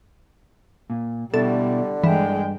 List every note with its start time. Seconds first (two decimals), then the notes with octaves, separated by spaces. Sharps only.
0.90 A#2
1.34 B2 D3 G3 E4 A4
2.04 G2 E3 G#3 G5